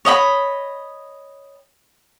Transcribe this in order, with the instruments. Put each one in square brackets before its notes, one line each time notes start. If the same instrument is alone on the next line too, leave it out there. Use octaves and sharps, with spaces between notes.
[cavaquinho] C#5 D#5 E5 B5